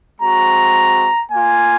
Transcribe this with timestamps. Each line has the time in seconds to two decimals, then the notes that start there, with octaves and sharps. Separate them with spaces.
0.20 G#3 C4 F#4 A#5
1.32 A#3 F4 G#5